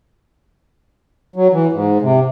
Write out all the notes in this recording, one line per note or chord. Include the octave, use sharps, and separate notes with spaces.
F#3
E3
G#2
C3